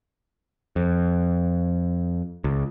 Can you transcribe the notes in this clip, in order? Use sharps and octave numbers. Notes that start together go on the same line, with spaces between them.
F2
C#2